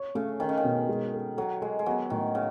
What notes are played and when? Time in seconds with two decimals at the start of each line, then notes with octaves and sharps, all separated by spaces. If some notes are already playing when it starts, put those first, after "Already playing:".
Already playing: C#5
0.15 C#3 A3
0.40 D#3 C#4
0.49 C#3
0.57 D#3
0.64 B2
0.89 G#3
1.13 A4
1.37 F#3 A4
1.61 G#3 A4
1.79 G#3
1.86 F#3 B3
2.10 A2 D#3
2.35 C#3